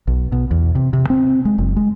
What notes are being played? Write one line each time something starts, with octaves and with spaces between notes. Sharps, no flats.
B1
B2
E2
C3
C3
C4
G#3
F#1
G#3